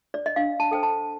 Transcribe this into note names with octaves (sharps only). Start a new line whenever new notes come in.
D5
D#5
D4 F5
A5
A4 C5 G5
A5